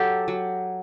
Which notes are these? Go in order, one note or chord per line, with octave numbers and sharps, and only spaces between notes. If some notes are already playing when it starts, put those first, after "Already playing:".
Already playing: F#3 G4 A4
F#3